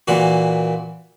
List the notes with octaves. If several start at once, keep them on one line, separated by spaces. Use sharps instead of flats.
A#2 E3 F#4